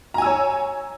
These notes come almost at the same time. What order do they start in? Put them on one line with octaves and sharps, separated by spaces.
A#5 G#5 E6 C#5